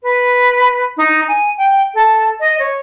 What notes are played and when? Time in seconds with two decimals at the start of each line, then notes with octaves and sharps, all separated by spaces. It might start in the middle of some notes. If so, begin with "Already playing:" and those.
0.03 B4
0.97 D#4
1.28 G#5
1.57 G5
1.94 A4
2.40 D#5
2.59 C#5